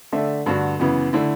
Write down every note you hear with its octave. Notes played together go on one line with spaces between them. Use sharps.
D3 A3 D4 A4 E5
G2 D3 A3 D4 F#4
F#2 C#3 E3 B3
D3 A3 E4